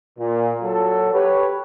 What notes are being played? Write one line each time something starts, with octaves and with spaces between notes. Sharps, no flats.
A#2
F#3 A4
G4 B4 C#5